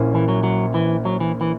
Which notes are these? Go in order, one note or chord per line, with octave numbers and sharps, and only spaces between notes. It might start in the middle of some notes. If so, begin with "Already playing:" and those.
Already playing: A#1 A#2 A#3 C#4 E4
E3
F#3
F#3
E3
F#3
E3
E3